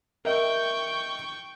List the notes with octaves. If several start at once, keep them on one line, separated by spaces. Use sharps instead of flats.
A#4 D#5 E5 G5 C#6